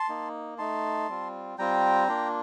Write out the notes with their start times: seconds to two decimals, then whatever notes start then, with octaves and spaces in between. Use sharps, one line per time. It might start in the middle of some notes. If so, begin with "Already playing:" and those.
Already playing: A5 C6
0.09 A#3 D#4
0.58 A3 D#4 A5 C6
1.08 G3 C4 F4
1.58 G3 C4 F4 G5 A#5
2.08 A#3 D4 F4